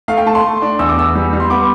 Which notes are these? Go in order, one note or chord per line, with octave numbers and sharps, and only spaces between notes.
A3 F5
G5
A3 A5
C6
A3
D4
E2 E6
D6
E2 E6
G3
G3
C6
B3 D6